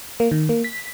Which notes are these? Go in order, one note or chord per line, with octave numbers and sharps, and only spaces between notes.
A#3
D#3
A#3
B6